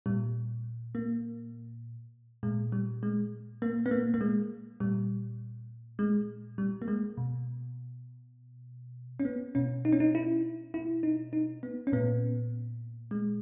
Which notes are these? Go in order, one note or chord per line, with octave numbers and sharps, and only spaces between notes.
A#2 G3
A#3
A#2 G#3
G3
G#3
A#3
B3
A#3
A#3
G#3
A#2 G3
G#3
G3
A#3
G#3
B2
C#4
B3
B2 C#4
D#4
C#4
D#4
E4
E4
D#4
D#4
B3
C#4
A#2 B3
G#3